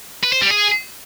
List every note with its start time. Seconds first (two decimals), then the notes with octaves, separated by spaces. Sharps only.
0.23 B4
0.32 C5
0.41 G3
0.50 G#4